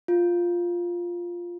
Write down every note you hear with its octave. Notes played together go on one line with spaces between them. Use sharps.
F4